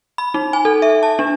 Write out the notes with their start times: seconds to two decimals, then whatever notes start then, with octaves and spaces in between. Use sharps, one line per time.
0.18 B5
0.34 D#4
0.53 G#5
0.65 A4
0.82 E5
1.03 A5
1.19 D4